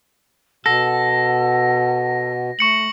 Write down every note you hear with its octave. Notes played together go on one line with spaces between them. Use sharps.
B2 A4 F#5 A#6
A3 C#6 C#7 F#7